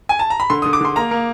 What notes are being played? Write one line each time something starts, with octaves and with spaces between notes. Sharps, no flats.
G#5
A5
A#5
B5
D3 C6
D3 D#6
D6
D3 C6
A#3 A#5
A#3